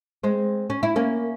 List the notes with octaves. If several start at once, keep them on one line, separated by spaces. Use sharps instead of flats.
G#3 C4
C#4
E4
A#3 C#4